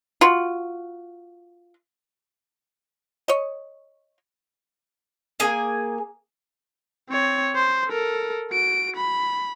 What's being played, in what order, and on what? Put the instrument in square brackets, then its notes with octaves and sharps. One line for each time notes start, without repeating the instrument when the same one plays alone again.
[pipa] F4 F#4
C#5 D#5
[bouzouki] A#3 G#4 G#5
[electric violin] C4 C#5
C5
A4 A#4
F#4 D7
B5